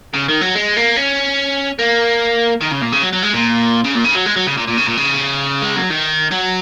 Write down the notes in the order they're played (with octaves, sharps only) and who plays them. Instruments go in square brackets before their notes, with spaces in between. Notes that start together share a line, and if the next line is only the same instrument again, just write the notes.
[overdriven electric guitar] C#3
D#3
F#3
G#3
A#3
C#4
A#3
D#3
C#3
A#2
C#3
F#3
F#3
G#3
A#2
C#3
A#2
C#3
F#3
G#3
F#3
C#3
A#2
A#2
C#3
A#2
C#3
G#3
F#3
D#3
F#3